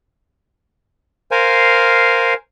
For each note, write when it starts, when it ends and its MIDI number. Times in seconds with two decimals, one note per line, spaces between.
1.31 2.34 70
1.31 2.34 72
1.31 2.34 77
1.31 2.34 80